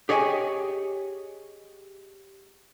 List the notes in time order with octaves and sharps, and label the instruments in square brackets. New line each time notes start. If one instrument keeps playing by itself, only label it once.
[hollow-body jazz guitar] G4 G#4 C#5 D#5 G5 G#5